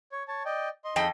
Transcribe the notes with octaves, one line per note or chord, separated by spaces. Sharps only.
C#5
C#5 A5
D5 D#5 G5
D#5 C6
F2 D#4 G#4 D#5 G5